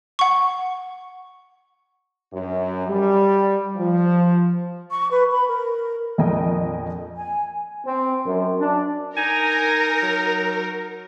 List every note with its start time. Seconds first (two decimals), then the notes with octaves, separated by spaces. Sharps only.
0.19 F#5 C#6
2.32 F#2
2.88 G3
3.77 F3
4.91 C#6
5.11 B4
5.32 B5
5.48 A#4
6.18 A#1 F2 A#4 D#5 G5
7.16 G#5
7.85 C4
8.26 F#2
8.60 D4
9.17 D#4 A#4 G#5
10.03 F#3